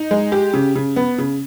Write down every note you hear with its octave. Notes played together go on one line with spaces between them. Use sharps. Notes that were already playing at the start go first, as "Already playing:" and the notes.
Already playing: D#4
G#3
G4
C#3
C#3
B3
C#3